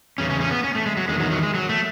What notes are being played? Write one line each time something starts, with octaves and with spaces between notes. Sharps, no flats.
E2 C#3 C#4
C#4
C#4
B3
C#4
A3
G#3
F#3
E2 D#3 G#3
F#3
F#3
G#3
F#3
A3